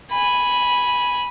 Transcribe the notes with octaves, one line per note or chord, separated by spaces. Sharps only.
G#5 B5